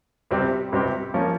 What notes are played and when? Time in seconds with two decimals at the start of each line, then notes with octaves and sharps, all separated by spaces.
0.31 C#2 C3 G3 C4 G4
0.72 C#2 C3 G3 C4 G4
1.14 F3 A#3 C#4 F4